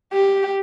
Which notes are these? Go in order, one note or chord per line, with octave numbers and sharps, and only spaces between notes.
G4